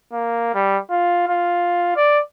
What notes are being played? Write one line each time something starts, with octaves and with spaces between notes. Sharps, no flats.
A#3
G3
F4
F4
D5